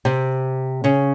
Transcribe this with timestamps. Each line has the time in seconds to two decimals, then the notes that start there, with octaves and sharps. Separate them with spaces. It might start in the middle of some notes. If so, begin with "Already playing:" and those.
0.05 C3 C4
0.84 C#3 C#4